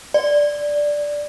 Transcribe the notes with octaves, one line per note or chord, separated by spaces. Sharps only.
D5